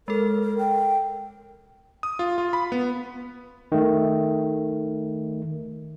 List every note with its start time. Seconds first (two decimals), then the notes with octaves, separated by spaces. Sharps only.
0.08 G#3 A4 A#4
0.42 A#4
0.58 G5
2.03 D#6
2.19 F4
2.38 F4
2.53 B5
2.72 B3
3.72 D#3 A3